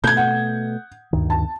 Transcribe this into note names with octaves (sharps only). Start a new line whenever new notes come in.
B2 A3 G6 G#6
F#5
D2 G2 D#3
A5